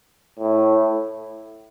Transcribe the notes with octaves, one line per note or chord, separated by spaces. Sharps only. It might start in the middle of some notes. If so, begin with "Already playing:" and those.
A2